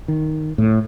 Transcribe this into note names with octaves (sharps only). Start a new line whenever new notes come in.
D#3
A2